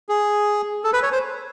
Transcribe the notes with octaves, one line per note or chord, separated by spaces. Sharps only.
G#4
A4
B4
C#5
C5